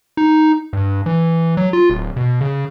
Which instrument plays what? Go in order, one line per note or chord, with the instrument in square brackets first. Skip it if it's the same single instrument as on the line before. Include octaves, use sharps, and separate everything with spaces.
[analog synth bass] D#4
G2
E3
F#3
F4
D1
B2
C#3